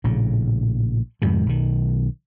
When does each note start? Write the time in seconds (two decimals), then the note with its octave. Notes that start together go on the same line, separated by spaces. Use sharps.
0.04 A#1 A2 C#3
1.22 F2 G#2 C3 D#3
1.46 B1 D#3